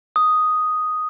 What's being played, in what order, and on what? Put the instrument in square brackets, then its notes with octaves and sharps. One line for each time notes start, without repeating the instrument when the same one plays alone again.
[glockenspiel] D#6